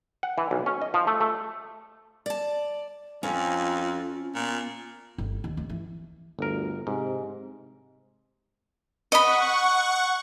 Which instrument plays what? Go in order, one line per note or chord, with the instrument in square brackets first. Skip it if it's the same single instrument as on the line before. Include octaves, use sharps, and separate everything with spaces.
[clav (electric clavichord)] F#5
E3
B1
C#4
D#5
F3
A3
A3
[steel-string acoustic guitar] D5 A5
[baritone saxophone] F2 [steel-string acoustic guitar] C#4 [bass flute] F4
[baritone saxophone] A#2 [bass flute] B3
[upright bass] G1
D#2
D#3
E3
[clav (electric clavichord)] G1 A#4 [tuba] D2
[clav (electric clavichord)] G#2 [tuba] C3
[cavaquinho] D#5 B5 [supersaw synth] F#5 C#6